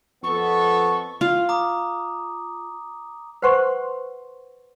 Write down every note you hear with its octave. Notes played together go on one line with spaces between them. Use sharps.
F2 B3 A4 C#6
F4 F5
A#5 D6 D#6
B4 C5 F#5 C6 C#6